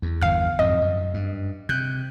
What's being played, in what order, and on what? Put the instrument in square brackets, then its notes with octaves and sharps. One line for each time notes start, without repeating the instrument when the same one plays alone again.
[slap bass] E2
[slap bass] G1 E2 D#3 [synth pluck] F5 F6
[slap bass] F2 G#2 B2 [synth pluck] D#5
[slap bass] F#2
G2
[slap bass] C3 [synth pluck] F#6 G6